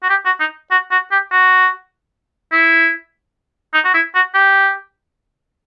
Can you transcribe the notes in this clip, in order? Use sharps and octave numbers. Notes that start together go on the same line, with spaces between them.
F#4
G4
F#4
D#4
F#4
F#4
G4
F#4
E4
D#4
F#4
E4
F#4
G4